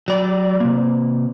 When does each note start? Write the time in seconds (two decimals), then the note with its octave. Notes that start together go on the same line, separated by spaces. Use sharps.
0.08 F#3 D5
0.60 C3 A#3